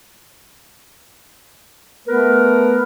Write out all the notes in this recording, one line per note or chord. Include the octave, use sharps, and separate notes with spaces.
A3 B3 A#4 B4